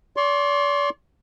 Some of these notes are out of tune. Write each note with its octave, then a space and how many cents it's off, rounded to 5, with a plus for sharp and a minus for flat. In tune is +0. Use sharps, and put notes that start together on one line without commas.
D5 -40 C6 +25